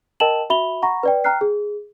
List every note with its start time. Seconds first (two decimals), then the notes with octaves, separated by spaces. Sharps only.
0.20 A#4 D#5 G5 A5 E7 F#7
0.50 F#4 E5 B5 F7 G7
0.83 F#5 A#5 B5 C#6 A#6
1.03 B4 D5 G5
1.24 G5 A#5 F6 F#6 C7
1.41 G#4